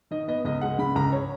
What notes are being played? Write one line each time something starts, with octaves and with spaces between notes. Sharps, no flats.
D#3 D#5
B3 D#5
C#2 D#5
G#3 F#5
C#3 B5
C#2 A#5
C#5